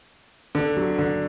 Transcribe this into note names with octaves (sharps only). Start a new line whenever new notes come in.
D3
F#3
D3